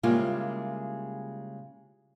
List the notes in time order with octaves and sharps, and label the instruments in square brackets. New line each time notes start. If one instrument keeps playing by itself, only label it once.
[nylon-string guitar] C#3 G3 G#3 A#3 E4 F4